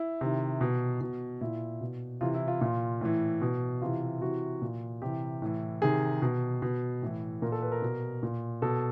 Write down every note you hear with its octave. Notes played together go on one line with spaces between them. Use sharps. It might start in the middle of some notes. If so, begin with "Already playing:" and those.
Already playing: E4
C3 D#3
B2
B2
A#2 E4
B2
C3 E3 F4
E4
F4
A#2 F4
A2 E3
B2
C3 E3 F4
C3 E3 F#4
A#2
C3 E3 G4
A2 E3
C3 D#3 G#4
B2
B2
A2 E3
A#2 A#4
A4
B4
A#4
B2
A#2
B2 A4